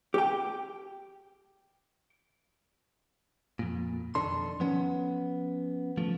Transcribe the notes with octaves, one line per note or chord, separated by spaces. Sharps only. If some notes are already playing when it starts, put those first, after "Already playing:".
G4 G5
F2 A#2
B1 F2 D#3 D4 A4 C6
F3 B3 C#4
F3 A3